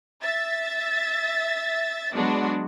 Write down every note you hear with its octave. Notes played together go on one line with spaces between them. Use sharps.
E5 A6
F#3 G#3 B3 D4 F#4